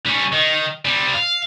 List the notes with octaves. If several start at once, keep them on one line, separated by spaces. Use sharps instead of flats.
G3 C#4
D#3
G3 C4
F5